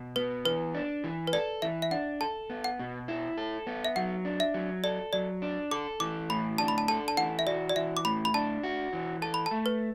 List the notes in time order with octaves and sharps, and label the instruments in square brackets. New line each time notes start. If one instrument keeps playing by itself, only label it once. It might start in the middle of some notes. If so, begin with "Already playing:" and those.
Already playing: [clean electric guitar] B2
[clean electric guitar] B3 [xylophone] B4
[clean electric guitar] E3 [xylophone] B4
[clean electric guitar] D4
E3
[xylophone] B4
[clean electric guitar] A4 [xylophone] D5
[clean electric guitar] E3 [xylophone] E5
[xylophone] E5
[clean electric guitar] D4 [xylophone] F#5
[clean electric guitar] A4 [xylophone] A5
[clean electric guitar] B3
[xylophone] F#5
[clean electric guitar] B2
E4
A4
B3
[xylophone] E5
[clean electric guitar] F#3 [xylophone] F#5
[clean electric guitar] D4
[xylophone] E5
[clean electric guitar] F#3
[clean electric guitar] A4 [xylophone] D5
[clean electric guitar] F#3 [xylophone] D5
[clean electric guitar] D4
[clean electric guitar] A4 [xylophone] D6
[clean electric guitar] E3 [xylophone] D6
[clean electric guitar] A2 [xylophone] B5
[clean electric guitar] D4 [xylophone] A5
[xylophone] B5
A5
[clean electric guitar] A4 [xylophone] A5
[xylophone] A5
[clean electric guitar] E3 [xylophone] F#5
[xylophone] E5
[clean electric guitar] F#4 [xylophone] D5
[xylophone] D5
[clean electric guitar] E3 [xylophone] E5
[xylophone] D6
[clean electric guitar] A2 [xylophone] B5
[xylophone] B5
[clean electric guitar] D4 [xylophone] A5
[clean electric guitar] F#4
E3
[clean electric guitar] A4 [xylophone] A5
[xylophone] B5
A5
[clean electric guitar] A3
[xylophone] B4